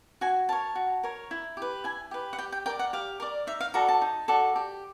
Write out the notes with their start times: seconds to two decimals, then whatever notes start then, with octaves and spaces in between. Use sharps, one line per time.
0.21 F#4 G#5
0.49 A#4 C#5 A5
0.75 F#4
1.03 A#4 C#5
1.31 E4
1.57 G4 B4
1.84 E4 G#5
2.11 G4 B4
2.33 F#5
2.38 G4 G5
2.52 G5
2.66 A#4 D5 G5
2.79 F#5
2.93 G4 F5
3.20 A#4 D5
3.47 D#4 E5
3.61 F5
3.74 F#4 A4 D5 A#5
3.88 A5
4.01 D#4
4.28 F#4 A4 D5
4.56 G4